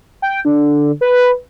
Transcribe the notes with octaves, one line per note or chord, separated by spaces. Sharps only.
G5
D3
B4